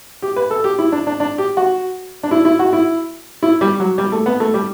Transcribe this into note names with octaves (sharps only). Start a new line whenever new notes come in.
G4
B4
A4
G4
E4
D4
D4
D4
G4
F#4
D4
E4
E4
F#4
E4
E4
G3
F#3
G3
A3
B3
A3
G3